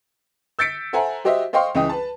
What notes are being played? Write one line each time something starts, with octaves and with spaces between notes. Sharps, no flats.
E6 G6 A6 B6 C#7 D7
A4 C5 E5 F#5 G#5 A#5
F#4 G4 C5 D#5 E5
C5 D#5 F5 G5 C6 C#6
C#2 E3 D#5 G5 D#6
B4 A5